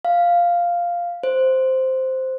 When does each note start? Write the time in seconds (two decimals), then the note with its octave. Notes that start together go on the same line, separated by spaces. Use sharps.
0.05 F5
1.23 C5